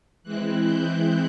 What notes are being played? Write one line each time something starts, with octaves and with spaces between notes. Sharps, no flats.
E3 G#3 C4 E4 F#6
G6